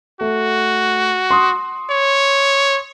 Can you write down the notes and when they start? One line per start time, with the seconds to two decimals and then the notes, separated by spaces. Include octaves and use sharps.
0.21 A3 F#4
1.31 C6 D#6
1.90 C#5